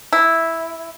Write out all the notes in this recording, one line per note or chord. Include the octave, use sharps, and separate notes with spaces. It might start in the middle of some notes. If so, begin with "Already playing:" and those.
E4